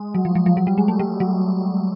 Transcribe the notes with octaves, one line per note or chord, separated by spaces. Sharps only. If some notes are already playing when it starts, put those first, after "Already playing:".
Already playing: G#3
F#3
F3
F3
F3
F#3
G3
G#3
A3
G3
F#3